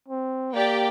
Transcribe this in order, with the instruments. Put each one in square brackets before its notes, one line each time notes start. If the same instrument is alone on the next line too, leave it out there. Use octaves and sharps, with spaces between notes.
[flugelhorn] C4
[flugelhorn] A#3 [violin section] G4 D5 G5